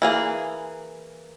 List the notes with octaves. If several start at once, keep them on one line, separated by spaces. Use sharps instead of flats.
E3 A#3 G#4